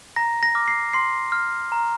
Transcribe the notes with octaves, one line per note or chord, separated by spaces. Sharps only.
A#5 A#6
A#6
D6 F6
C7
C6 C7
F6
A#5